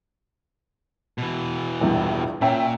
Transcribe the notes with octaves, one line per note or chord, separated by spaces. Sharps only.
B2 E3
A#1 E2 G2
A#2 C#4 E5 G5